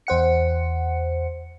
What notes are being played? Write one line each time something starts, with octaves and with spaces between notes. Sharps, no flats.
E2 C5 F#5 C#7